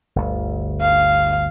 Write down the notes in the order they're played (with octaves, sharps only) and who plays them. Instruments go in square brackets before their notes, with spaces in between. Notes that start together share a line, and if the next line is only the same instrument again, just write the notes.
[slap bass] G1 D2
[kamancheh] F5